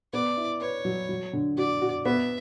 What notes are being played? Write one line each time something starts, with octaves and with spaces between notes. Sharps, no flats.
B3 D5
E4
B4 C#5
F#3
F#3
D3
F#4 D5
F#4
B3 E5